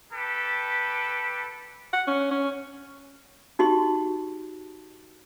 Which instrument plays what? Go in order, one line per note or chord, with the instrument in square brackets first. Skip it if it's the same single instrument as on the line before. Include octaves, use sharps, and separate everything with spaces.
[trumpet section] G4 A4 B4
[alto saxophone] F#5
C#4
C#4
[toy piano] D#4 F#4 G4 C6